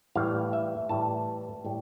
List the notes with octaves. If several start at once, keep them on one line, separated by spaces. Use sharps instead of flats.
A2 E3 G3 F5
E5
A2 E3 G3 A5
A2 G3